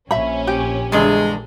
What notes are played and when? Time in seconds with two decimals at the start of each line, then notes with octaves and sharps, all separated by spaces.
0.11 A#1 C#4 E5 B5
0.47 G4
0.92 E2 G2 D3 G#3